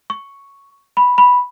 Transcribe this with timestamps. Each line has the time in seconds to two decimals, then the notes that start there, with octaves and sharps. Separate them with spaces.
0.10 C#6
0.97 B5
1.18 B5